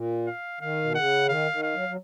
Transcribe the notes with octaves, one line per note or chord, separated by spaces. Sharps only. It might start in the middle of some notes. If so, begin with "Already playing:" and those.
Already playing: A#2
F5
D#3 F5
B2
C#3 F#5
D#3 F5
D#3
F5
F#3
F#3